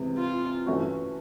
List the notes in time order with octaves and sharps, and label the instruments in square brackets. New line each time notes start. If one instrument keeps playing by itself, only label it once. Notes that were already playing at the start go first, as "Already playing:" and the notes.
Already playing: [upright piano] C3 E3 G#3
[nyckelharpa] F4
[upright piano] E3 A3 C#4 F#4